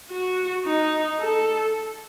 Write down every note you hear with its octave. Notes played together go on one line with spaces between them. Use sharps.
F#4
D#4
A4